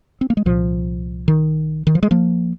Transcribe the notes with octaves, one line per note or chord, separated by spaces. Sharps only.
C4
A#3
G#3
C2 A#2 F3
D#3
D#3
F3
G#3
F3 A#3